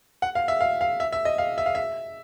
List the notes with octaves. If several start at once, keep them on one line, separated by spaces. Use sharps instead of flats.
F#5
F5
E5
F5
F5
E5
E5
D#5
F5
E5
F5
E5